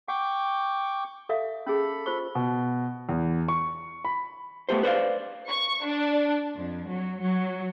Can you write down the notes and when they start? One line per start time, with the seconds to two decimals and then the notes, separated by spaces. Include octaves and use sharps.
0.08 F#5 G5 C#6 D6
1.29 A4 E5 F5
1.67 C#4 G#4 A4 B5
2.06 F4 C5 C#6
2.35 B2
3.09 E2
3.48 C#6
4.05 B5
4.69 A3 B3 G4 C5
4.83 B4 C5 D5 E5 F5
5.50 C#6
5.86 D4
6.58 F2
6.90 F#3
7.22 F#3